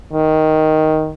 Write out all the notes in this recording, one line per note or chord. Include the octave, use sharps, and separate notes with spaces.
D#3